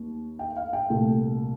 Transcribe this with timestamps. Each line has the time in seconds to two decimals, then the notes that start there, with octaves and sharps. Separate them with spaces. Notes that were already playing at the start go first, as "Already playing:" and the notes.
Already playing: D#2
0.39 G5
0.56 F5
0.73 G5
0.90 C2 A#2 A3